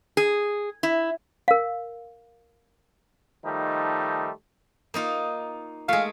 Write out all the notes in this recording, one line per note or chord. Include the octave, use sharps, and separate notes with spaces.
G#4
E4
A#4 F5
D#3 F3 G3 A3 D#4
A#3 D#4 F4
G#3 A3 F5